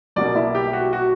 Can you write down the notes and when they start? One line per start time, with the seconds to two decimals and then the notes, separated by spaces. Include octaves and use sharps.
0.16 B1 B2 G3 A#3 D5
0.35 E4
0.55 G4
0.73 F#4
0.93 F#4